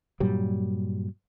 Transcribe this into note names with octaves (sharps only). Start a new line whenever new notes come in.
G2 A#2 F#3 G3